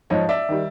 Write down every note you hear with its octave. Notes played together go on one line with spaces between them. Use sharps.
G#2 F3 C#5 D#5
D5 E5
D#3 G3